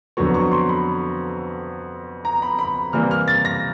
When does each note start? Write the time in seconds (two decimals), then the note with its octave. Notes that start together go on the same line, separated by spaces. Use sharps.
0.17 F2 D3 F#3 B3 C#6
0.34 C#6
0.51 C6
0.69 B5
2.25 A#5
2.42 B5
2.59 B5
2.93 C3 E3 G3 A#3 F6
3.11 F6
3.28 A6
3.45 A#6